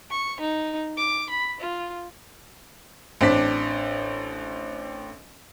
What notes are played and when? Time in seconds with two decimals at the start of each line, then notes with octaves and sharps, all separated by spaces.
0.11 C#6
0.40 D#4
0.97 D6
1.30 B5
1.61 F4
3.21 A1 C4 D4 B6